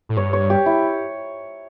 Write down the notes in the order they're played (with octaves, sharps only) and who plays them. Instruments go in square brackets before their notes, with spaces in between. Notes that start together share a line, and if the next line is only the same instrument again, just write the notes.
[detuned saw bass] A2
[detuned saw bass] G2 [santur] C#5
[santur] C#5
G4
E4